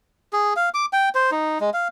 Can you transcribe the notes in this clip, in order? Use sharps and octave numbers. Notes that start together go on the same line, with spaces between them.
G#4
F5
D6
G5
C5
D#4
G#3
F5